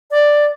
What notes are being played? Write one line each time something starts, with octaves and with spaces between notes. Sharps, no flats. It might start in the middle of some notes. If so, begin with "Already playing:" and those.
D5